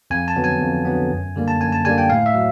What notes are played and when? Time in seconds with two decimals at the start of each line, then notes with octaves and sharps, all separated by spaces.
0.10 F2 G#5
0.28 A5
0.36 D3 F#3 B3
0.44 G#5
0.61 F2
0.85 D3 F#3 B3
1.10 F#2
1.36 D3 G3 A#3
1.48 A5
1.61 F#2 G#5
1.72 A5
1.85 D3 G3 A#3 G#5
1.98 G5
2.10 A2 F5
2.26 E5
2.35 F#3